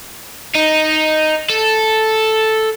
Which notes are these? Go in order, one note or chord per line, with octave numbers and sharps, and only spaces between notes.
D#4
A4